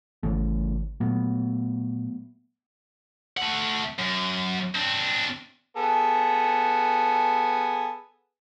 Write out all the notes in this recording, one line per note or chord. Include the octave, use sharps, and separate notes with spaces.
G#1 C#3 E3 A3
A#2 F#3 A3 B3
A3 F#5
F#2
C4 D4
B3 G#4 A4